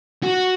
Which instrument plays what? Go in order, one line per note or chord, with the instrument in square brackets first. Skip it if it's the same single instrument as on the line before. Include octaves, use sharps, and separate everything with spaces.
[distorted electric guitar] F#4